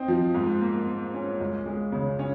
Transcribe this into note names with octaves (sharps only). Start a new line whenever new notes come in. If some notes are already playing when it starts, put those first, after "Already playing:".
Already playing: C4 D#4
F3
G#2
A#3
A#3
C#4
C#2
G#3
C#3
C#4